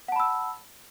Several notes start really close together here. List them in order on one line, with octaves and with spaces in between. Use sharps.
F#5 A5 B5 E6